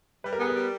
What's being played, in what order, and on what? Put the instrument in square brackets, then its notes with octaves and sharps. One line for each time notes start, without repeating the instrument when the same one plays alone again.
[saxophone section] G3 [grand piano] B4
[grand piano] A#4
[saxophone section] B3 [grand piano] G#4
[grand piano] A#4
[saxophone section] G3